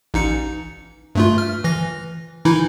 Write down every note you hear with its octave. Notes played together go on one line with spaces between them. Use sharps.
A1 D#4 C#7
G2 A3 F4
F6
E3 A#6
E3 D#4 E4